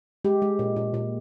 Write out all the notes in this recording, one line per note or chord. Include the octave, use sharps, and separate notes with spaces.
G#3 G4
G#3
A#2
A#2
A#2